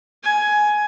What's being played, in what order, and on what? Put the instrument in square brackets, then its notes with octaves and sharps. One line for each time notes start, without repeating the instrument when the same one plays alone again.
[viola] G#5